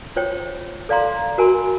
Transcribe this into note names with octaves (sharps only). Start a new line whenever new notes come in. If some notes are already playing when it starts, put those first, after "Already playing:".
F4 C5 C#5 G5
A4 D5 F5 A#5 C6
F#4 A#4 G#5 B5 C6